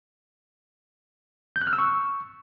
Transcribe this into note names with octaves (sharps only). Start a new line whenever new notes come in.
G6
F#6
F6
E6
C#6